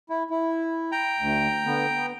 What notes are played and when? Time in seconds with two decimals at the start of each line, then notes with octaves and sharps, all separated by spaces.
0.10 E4
0.30 E4
0.92 G5 A#5
1.20 D2
1.66 D3 B3
1.96 B3